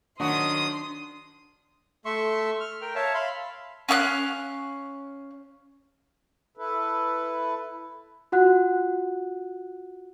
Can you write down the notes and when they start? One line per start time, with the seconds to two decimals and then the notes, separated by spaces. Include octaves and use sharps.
0.20 D#3 F#3 D4 F#4 F#5 C6 D#6
2.05 A3 E5 C6 C#6
2.60 F6
2.82 A#4 G5
2.95 C#5 E5 F5 A5
3.14 F5 B5 C6
3.89 C#4 F5 C#6 F#6
6.57 E4 A4 B4
8.32 F4 F#4 F#5 F#6